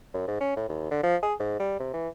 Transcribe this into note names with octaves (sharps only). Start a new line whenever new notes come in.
F#2
G#2
C#4
A2
D#2
D3
F3
G#4
G#2
G3
C3
E3